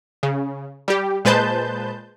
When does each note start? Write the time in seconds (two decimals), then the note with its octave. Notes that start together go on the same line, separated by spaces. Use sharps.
0.23 C#3
0.88 G3 G4
1.25 A#2 G#3 B4 C5 A5 G6